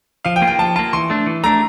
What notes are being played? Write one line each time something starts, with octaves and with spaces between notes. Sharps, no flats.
F3 F5
G5
A#3 F4
G5
F3 A5
A#3 F4 A5
E3 C6
A3 D4
E3
A3 D4 A#5